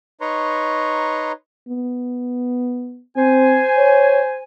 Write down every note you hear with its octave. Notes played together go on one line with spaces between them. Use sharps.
D#4 B4 C#5 A#5 C6 C#6
B3
C4 C5 G#5
C#5